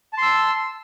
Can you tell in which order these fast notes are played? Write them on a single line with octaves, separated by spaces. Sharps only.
A5 C6 E6